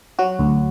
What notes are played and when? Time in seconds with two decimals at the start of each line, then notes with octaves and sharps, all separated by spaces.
0.19 F#3 F#4
0.39 D2